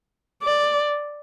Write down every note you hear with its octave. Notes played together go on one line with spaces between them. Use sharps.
D5